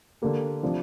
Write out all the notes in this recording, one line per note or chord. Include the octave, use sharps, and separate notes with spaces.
D3 A#3 G4
C3 F3 D4